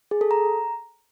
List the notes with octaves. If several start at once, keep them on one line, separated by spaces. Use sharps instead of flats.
G#4
A4
A#5